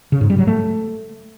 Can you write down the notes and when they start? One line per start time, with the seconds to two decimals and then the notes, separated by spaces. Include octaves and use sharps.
0.12 C#3
0.21 G#2
0.30 G3
0.38 F#3
0.47 A3